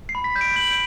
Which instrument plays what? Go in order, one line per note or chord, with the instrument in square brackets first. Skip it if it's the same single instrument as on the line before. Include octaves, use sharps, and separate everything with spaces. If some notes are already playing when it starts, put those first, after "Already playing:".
[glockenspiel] C7
B5
B6
G6
D7
G6 F#7
D7